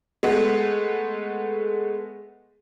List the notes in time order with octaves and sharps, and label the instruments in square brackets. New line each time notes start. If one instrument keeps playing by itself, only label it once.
[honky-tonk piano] G#3 A3 B3